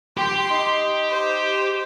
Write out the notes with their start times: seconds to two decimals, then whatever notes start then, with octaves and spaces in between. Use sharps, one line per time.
0.17 G4 G5 C6
0.50 D#4
1.09 C5